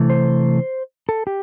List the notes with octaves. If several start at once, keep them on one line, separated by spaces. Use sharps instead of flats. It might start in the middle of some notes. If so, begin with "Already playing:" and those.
Already playing: C3 E3 A3
C5
A4
G4